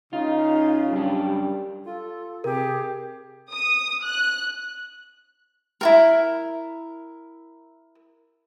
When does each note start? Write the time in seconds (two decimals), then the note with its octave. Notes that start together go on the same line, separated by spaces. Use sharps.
0.13 C#3 D#4 F4
0.91 F#2 G3 D4
1.85 F4 A4
2.44 C3 G4 G#4 A#4
3.53 D#6
4.05 F#6
5.81 E4 F#4 A#4